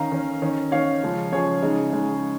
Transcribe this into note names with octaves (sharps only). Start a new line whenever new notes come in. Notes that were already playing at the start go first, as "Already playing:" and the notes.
Already playing: D#3 C#4 F5 A#5
D#3 C#4
D#3 C#4
D#3 C#4 C#5 F5
C#3 F3 G#3
C#3 F3 G#3 G#4 C#5
C#3 G#3 D#4
C#3 G#3 D#4